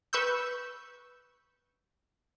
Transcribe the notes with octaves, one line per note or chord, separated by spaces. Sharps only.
B4 C#6 E6 G6